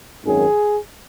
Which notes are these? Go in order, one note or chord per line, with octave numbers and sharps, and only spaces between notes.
G#1 F#2 D#3 F#3 G#4